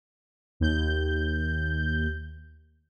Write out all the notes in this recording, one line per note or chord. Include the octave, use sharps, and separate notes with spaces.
D#2 G6